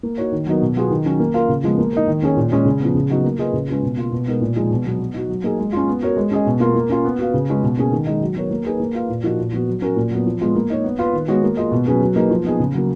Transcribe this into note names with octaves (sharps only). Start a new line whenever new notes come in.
A#3
D#4 F#4 C#5
D#3
F#3 B3 D#4 A#4
B2
F#3 B3 F4 G#4
D#3
F#3 C#4
A#3
F4 A#4 F5
C#3
F3 G#3 B3
A#3
D#4 A#4
D#3
A#3 C#4 G#4 C#5
A#2
G#3 C#4 G#4 C#5
C#3
F3 B3
C#3
F#3 B3 D#4 F#4
A#3
F4 G#4 B4 D#5
C#3
G#3 C#4 F4 B4
B2
A#3 F4
B2
G#3 B3 D#4 A#4
A#2
F3 G#3 D#4 G#4
B2
F#3 B3
B3
D#4 F#4
F#3
A#3 D#4 G#4
G#3
C#4 F4
B3
F#4 A#4 C#5
G#3
C#4 G#4 D#5
B2
A#3 F4 A#4
A#3
C#4 F4
B3
F#4 B4 F5
C#3
G#3 C#4 F4 B4
B2
A#3 C#4 G#4
D#3
G#3 D#4
F#3
B3 F#4 A#4 C#5
A#3
D#4 G#4 B4
A#3
F4 B4 F5
A#2
F3 A#3 D#4 F#4
A#2
F3 B3 F#4
F#3
C#4 F#4 A#4
A#2
F#3 B3
F3
G#3 B3 F4
A#3
D#4 A#4 C#5
B3
F4 B4 F5
D#3
G#3 B3 F#4 C#5
A#3
F4 G#4 D#5
B2
F#3 C#4 G#4 B4
F#3
A#3 D#4 G#4 B4
F3
B3 D#4 G#4
C#3
F#3 A#3